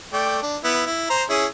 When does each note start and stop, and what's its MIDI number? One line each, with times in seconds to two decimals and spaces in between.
0.13 0.38 57
0.13 0.38 74
0.13 0.38 79
0.43 0.57 62
0.64 0.84 59
0.64 0.84 64
0.86 1.07 64
1.10 1.24 72
1.10 1.24 82
1.30 1.46 61
1.30 1.46 64
1.30 1.46 68